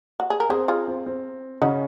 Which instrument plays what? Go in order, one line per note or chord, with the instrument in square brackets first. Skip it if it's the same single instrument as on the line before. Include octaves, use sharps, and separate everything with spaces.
[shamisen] F#4
G#4
A#4
[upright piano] C4 [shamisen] G#4 C5
[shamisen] F4 G#4
[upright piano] C4
C4
[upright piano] C#3 C#4 [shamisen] D#4 F#4